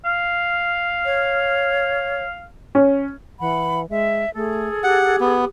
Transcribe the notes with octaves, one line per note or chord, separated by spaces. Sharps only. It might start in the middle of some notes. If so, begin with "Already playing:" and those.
F5
C#5
C#4
E3 F#5 B5
G#3 E5
A3 G#4 A4
G4 F#5
B3